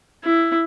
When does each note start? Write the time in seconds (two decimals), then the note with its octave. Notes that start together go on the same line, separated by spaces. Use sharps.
0.24 E4